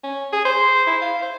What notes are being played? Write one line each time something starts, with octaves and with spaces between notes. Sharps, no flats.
C#4
G#4
C5
E4
F5
C5